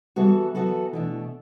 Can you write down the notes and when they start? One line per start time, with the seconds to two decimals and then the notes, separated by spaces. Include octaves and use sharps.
0.16 E3 G3 B3 F#4 A4
0.54 E3 F#3 B3 F#4 A4
0.93 B2 E3 A3 D4